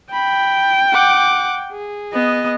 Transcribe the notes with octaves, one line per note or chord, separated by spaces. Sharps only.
G5 B5
F#5 D6
G#4
B3 D#5